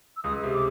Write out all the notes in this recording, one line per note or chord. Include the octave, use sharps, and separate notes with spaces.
E6
C#2 D#6
C3
D6